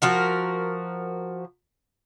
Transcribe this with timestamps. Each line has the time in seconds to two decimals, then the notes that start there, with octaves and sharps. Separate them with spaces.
0.02 F3 F#4 A#4